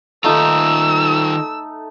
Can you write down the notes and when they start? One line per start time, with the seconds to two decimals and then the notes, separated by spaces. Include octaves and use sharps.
0.24 D#3 A3 D#4 F4 E6